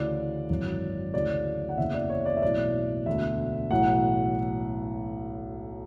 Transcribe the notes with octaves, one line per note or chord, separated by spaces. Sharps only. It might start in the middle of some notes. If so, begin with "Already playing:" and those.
Already playing: D2 C#3 E3 D5
G#1 F#2 E3
D2 C#3 E3 D5
F#5
F#1 E2 C#3 E3 E5
D5
C#5
D5
E5
B1 A2 E3 D5
E1 D2 D3 E5
B1 A2 E3 F#5